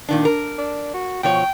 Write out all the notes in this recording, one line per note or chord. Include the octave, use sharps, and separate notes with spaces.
A#2 D#3 D4
A#4
D4
F#4
B2 F3 C#5 G5